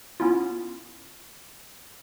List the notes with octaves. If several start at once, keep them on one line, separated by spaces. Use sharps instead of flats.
B3 C#4 E4 F4